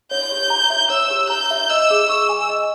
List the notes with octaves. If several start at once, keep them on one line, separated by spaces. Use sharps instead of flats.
C#5 G6
G4
A#5
E5
C#5 E6
G4
A#5 G6
E5
D#5 E6
G#4
C#6 E6
G#5
D#5